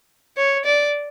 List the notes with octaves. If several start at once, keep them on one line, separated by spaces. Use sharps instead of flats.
C#5
D5